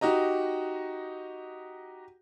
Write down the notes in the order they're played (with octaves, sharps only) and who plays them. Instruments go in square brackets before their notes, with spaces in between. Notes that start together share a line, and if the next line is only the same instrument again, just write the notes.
[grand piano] D#4 F#4 G4 D#5 A#5